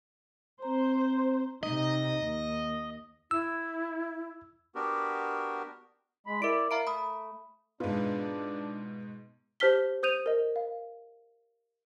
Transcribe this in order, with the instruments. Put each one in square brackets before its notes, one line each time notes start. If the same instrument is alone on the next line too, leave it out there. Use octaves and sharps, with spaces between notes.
[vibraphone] C4 A#5 [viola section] C5
[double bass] C3 D#4 [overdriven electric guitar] D#5
[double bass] D#2
[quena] E4 [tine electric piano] E6
[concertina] B3 D4 F#4 G4 A#4
[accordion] G#3 B5
[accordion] E4 D5 [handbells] A#4 D7
[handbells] E5 A#5 D7 [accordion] F5
[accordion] A3 [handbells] B5 D#6
[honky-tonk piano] G#2 B2 [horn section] D4 [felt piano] F4 G#4 [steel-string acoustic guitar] B4
[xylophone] G4 C5 A5 F6 B6 G7
C5 D#6 G6 D#7 F7
A#4 D#5
F5